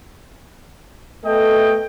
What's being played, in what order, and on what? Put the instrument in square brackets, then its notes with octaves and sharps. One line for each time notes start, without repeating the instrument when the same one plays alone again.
[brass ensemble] A3 B3 A4 D#5 G5